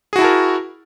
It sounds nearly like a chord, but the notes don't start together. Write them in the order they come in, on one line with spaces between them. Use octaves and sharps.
G#4 F#4 E4 A5 A#4